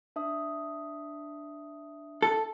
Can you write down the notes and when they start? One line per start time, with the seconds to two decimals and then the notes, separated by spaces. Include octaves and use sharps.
0.16 D4 E5 D#6
2.22 A4